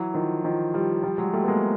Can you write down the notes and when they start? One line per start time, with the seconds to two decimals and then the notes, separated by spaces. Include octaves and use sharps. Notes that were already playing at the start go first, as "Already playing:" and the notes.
Already playing: E3 F#3
0.14 D#3 F3
0.44 D#3 F3
0.74 F3 G3
1.03 F3 G3
1.18 F#3 G#3
1.33 G3 A3
1.44 B3
1.48 G#3 A#3